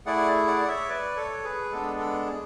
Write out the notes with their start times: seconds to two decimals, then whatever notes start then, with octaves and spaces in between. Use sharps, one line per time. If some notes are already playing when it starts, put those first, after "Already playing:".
0.06 A3 E4 G#4 D5 F#5
0.47 D5 F#5
0.64 D5
0.68 C#5 E5
0.89 B4 D5
1.16 A4 C#5
1.44 G#4 B4
1.71 G#3 B3 D4 A4
1.99 A4
2.27 G#4